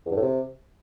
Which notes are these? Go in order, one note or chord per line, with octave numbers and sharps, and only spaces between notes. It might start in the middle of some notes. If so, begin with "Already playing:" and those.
E2
G2
A2
C3